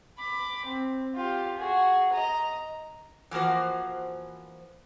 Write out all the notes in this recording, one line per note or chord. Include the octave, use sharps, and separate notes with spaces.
B5 D6
C4
F4 G4
F#4 G#4
D#5 A#5
E3 F3 A#3 F#4 C5